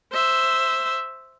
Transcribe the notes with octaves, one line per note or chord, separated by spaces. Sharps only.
C5 E5